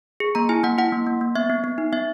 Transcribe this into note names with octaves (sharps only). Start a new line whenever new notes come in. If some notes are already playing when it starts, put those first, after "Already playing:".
G#4
A#3 A#5
E4 G#5
A#3 F#5
E4 F#5
A#3
A#3
A#3
B3 E5
B3
B3
D#4
B3 E5